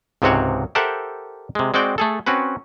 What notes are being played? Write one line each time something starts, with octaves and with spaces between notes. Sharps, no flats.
C#2 G#2 C3 C4 F#4 C#5
G4 A4 A#4 C5 E5 F#5
C3 G#3
G#3 C4 F#4 D5 G5
A3 G#4 A4
C4 C#4 F#4 B4